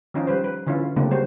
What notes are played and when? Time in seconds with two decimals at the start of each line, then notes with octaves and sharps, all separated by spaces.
0.14 D#3 F3 C#4 D#4 F4
0.27 G3 B4 C5
0.44 B4
0.67 D3 E3 C#4 E4 F4
0.96 C#3 F#3 A3 A#3 C4 D4
1.11 G3 F#4 C5